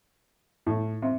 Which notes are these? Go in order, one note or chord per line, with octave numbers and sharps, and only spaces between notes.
A2
C3